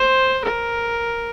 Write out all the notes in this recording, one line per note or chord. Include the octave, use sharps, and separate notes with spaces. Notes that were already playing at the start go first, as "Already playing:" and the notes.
Already playing: C5
A#4